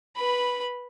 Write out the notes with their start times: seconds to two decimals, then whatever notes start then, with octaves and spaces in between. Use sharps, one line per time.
0.16 B4 B5